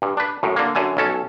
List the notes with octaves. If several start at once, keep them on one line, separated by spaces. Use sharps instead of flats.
G2
D4 B4
F#2 A2
D3 A#3
F#2 D3 G#5
B1 C#4 A4